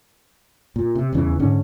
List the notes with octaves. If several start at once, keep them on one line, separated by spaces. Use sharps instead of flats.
A#2
C3
D#1 E2 C#3 E3
G#2 D3 C#4